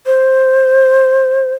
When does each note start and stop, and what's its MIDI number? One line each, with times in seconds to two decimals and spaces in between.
0.06 1.54 72